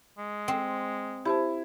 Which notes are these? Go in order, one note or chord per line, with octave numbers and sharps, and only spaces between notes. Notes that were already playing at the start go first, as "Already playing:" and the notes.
G#3
C4
E4 G4 C5 A5